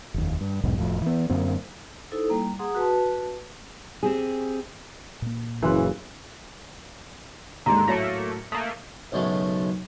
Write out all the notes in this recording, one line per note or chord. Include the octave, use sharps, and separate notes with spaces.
F1 D#2
G2
B1 E2 G#2 B2
F1 F2 A2
E3 B3
F#2 D3 A#3 C4
D#4 E4 A4 C5
G3 A#3 A#5
G#4 F#5 A#5 C6 D#6
F#4 B4 A5
C4 G4 G#4
A#2 A#3
F#1 C#3 E3 C6 F#6
D#2 G#2 D3 A#5 C6
A2 F#3 A3 A#3 C#5 A#6 C#7
A3 A#3 D#6
B1 F#2 C#3 G#3 A3